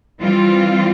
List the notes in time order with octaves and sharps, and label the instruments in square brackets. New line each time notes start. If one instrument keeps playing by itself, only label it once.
[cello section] E3 G3 C4 F4